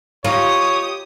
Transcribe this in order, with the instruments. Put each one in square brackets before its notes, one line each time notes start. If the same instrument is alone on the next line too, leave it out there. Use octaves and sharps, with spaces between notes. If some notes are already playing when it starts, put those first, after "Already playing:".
[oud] D#4 F4 [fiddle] G4 D#6 [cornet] C#5